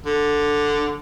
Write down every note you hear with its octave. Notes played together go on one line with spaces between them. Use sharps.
D3